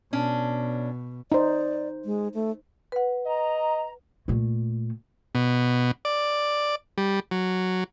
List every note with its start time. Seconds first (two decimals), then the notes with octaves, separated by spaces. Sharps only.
0.13 B2 C#4 D4
1.32 D#4 C5 D5
2.05 G#3
2.34 A3
2.92 B4 F#5
3.26 D#5 A#5
4.28 A#2 A3
5.35 B2
6.05 D5
6.98 G3
7.31 F#3